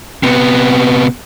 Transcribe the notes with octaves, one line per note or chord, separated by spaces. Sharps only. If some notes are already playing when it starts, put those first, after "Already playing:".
C3 B3